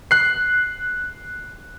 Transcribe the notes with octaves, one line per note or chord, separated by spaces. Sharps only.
F#6 C7